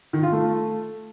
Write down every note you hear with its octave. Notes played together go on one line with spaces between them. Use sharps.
D#3
F4
A3